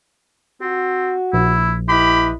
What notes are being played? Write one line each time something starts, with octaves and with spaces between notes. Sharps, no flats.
C4 F#4
A#1 E4
E4 G4 B4 D#5 B5